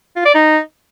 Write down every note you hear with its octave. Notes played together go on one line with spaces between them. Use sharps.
F4
D5
D#4